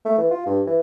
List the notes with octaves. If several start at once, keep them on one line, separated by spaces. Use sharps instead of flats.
A3
E3
F4
G2
E3